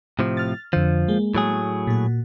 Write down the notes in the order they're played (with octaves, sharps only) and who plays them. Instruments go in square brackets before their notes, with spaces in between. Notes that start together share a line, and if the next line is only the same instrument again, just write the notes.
[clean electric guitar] A2 C3 F3
[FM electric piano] F6 A6
[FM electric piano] F2 D3 [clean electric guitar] F3
[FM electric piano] G#3 A#3
[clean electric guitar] A2 F#3 G#4
[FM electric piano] A#2 F#4